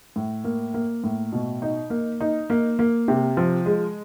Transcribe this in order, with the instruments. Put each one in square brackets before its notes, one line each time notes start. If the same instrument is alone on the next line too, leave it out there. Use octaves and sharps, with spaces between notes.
[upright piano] A2
A#3
A#3
A2
B2
D#4
A#3
D#4
A#3
A#3
C3
F3
G#3